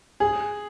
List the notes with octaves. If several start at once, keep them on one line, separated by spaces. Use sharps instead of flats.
G#4